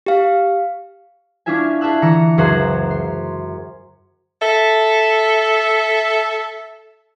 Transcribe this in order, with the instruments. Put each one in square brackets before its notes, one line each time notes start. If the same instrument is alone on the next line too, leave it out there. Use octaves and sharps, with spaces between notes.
[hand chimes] G4 F5
[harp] C#4 D4 E4 F4 E5 G#5
G#4 E5 A5 E6 F#6
D3 E3 A#5 E6 C#7
C#2 F#2 F#4 G#4 C5 F#6
C6
[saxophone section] A4 E5